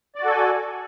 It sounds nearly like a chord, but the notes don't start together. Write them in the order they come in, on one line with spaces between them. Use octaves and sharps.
D5 F#4 A4 G#5